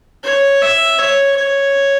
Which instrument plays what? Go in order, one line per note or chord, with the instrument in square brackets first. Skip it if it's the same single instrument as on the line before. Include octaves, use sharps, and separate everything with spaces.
[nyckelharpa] C#5
E5
C#5
C#5